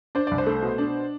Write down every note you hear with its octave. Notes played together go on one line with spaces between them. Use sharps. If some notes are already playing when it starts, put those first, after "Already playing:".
D4 C5
C2 D5
C5
A3
B2
D4